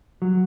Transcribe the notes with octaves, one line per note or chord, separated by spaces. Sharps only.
F#3